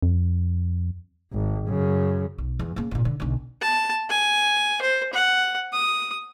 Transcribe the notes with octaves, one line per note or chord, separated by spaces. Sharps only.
F2
G#1
F#2 C#3
B1
E2
C#3 A#3
G#1 A#2
D3
B1 D3
A5
G#5
C5
F#5
D#6